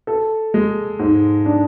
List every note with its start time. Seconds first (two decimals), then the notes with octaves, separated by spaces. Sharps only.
0.07 A4
0.54 G#3
0.99 G#2
1.46 D4